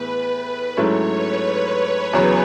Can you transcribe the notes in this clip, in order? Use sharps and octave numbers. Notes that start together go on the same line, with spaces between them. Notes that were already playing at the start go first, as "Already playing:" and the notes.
Already playing: A2 E3 B3 G#4 B4
G#2 F#3 A3 C#4 E4 C#5
B4
E2 C#3 F#3 B3